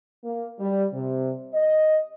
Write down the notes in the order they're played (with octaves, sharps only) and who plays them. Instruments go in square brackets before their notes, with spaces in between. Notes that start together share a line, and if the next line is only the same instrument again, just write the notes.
[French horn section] A#3
G3
C3
D#5